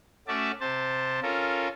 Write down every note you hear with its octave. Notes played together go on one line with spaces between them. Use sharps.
A3 C#4 F#4 D5 E5 A5
C3 C5 A5
C#4 F4 A4 A#4